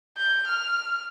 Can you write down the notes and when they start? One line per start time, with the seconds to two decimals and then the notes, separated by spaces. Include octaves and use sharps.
0.17 G6
0.48 F6